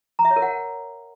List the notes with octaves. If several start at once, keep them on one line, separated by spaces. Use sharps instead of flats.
A#5
E5
C#5
A#4
F#5